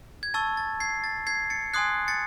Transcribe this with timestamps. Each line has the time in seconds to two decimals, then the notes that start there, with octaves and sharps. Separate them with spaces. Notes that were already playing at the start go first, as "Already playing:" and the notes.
0.23 G#6
0.34 A5 C#6 E6 A6
0.57 A6
0.80 G#6 C7
1.04 A6
1.27 G#6 C7
1.50 A6 C#7
1.73 G#5 C6 D#6 F#6 G#6 C7
2.08 A6 C#7